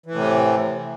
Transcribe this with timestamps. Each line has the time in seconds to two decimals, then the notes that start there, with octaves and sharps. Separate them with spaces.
0.06 E3
0.11 A2
0.15 C3